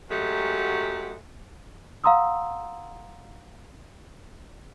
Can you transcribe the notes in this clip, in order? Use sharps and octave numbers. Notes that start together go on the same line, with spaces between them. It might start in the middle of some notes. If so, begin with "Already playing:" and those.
F#2 F#3 G#3 A3 G4 F#5
F5 F#5 A#5 C6 D#6 E6